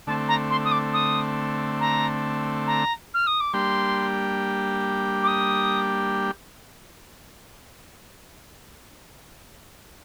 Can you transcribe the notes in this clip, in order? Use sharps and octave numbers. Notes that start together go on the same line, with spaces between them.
D3 A3 C4 A5
A#5
C6
D#6
D6
D#6
A#5
A#5
F6
D#6
D6
G3 A#3 D4 G4 C6
D6
D#6